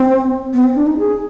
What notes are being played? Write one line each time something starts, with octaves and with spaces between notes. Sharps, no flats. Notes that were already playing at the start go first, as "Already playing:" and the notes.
Already playing: C4
B3
C4
D4
D#4
G#4